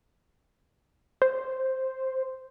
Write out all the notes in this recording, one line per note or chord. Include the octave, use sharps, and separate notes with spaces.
C5